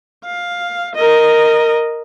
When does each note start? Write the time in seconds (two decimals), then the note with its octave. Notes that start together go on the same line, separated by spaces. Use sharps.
0.25 F5
0.95 A#4 D#5